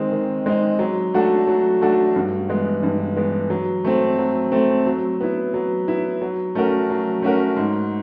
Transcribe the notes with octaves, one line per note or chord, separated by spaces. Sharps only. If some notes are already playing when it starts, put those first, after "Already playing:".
Already playing: D#3 G#3 C4 D#4
D#3
G#3 C4 D#4
F#3
A3 D4 F#4 A4
F#3
A3 D4 F#4 A4
G2
E3 G#3 B3
G2
E3 G#3 B3
F#3
A3 C4
F#3
A3 C4
F#3
B3 E4
F#3
B3 E4
F#3
A3 C#4 F#4 A#4
F#3
A3 C#4 F#4 A#4
G#2